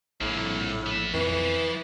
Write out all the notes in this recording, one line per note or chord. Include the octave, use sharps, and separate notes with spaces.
A#1 A2 A#3 G#4
C2
B3 E5
B1 F2 A2 E3
F3